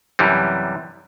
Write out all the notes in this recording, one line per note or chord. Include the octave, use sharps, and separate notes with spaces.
F#2 C3 E3 G3